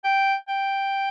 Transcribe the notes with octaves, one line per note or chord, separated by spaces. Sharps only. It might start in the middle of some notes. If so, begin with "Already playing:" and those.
G5
G5